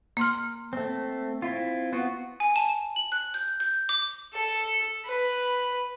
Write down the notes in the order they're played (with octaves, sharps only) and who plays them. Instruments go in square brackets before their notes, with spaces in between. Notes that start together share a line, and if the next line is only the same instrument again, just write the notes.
[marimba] A#3 C6 F6
[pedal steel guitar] A3 C4
C4 E4 F4
B3 F4 F#4
[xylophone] G#5
A5
F#7
F#6
G6
G6
D6
[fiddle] A4
B4